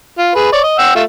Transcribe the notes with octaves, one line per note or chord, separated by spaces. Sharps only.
F4
G#4 B4
C#5 D5
D#5
F#5 G5 E6
A3 F4 E5